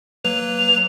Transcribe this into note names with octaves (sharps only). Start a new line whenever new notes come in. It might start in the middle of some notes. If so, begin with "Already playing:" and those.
F#3 A#3 B4 F7